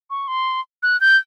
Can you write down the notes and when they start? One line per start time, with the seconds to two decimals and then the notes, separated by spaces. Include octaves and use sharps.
0.10 C#6
0.28 C6
0.83 F#6
1.01 G6